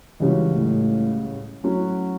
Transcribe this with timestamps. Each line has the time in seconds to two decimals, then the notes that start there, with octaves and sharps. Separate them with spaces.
0.20 C#2 C#3 E3 G3 C#4 F#4
0.56 A2
1.64 A2 F#3 C#4 F#4